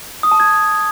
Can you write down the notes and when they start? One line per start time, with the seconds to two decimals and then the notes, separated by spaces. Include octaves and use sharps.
0.23 D#6
0.31 A5
0.40 G#6